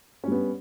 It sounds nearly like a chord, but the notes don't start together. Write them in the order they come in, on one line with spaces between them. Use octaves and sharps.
C#4 G3 B3